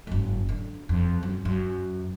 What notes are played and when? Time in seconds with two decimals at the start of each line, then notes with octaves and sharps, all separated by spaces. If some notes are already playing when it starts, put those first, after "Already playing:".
0.07 F#1 G#2
0.49 D3
0.89 F2
1.23 F#2
1.45 F#2